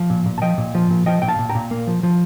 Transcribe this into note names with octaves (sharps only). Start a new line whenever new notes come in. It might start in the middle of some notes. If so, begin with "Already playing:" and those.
Already playing: F3
A#2
A#2
A5
F3 D#5 G5
A#2
F3
A#2
F3 D#5 G5
A#2 G5
F5 A5
A#2
G5 A#5
A#2
A#3
F3
F3